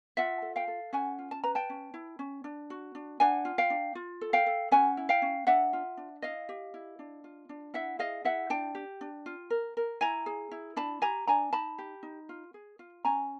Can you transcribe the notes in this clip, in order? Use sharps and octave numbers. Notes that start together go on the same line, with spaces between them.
F4 E5 F#5
A4
F5 G5
A4
C#4 F#5 G#5
F4
A5
B4 A#5
G5 A5
C#4
E4
C#4
D4
F#4
D4
D4 F#5 G#5
F4
F5 G5
D4
F4
A4
F5 G5
A4
C#4 F#5 G#5
E4
F5 G5
C#4
D4 E5 F#5
F4
D4
E4 D#5 F5
G4
E4
D4
F4
D4
E4 E5 F#5
G#4 D#5 F5
E4 E5 F#5
D4 G5 A5
G4
D4
F4
A#4
A#4
E4 G#5 A#5
G#4
E4
D4 A5 B5
G4 G#5 A#5
D4 G#5 A#5
D#4 A5 B5
G4
D#4
F4
G#4
F4
C#4 G#5 A#5